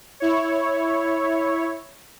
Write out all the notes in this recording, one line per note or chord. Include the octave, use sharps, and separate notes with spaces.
E4 C#5